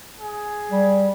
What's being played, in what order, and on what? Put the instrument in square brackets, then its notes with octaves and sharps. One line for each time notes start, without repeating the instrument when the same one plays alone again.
[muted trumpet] G#4
[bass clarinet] G3